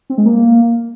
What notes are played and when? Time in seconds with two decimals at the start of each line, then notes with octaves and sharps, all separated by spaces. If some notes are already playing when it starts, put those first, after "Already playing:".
0.10 C4
0.18 G#3
0.26 A#3